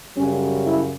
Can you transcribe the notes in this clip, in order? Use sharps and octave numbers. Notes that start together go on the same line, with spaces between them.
F#2 C#3 G3 C#4
E4